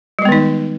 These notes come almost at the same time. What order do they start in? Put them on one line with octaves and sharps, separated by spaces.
G3 G#3 B3 D#3 D#4